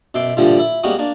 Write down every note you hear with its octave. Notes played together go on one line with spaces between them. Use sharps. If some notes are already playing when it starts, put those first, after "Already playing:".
F#2 B2 E5 C6 D6
G2 A#2 D3 E3 F3 G3
E4
G3 G#3 A#3 B3 C#4 F#4
A#3 D4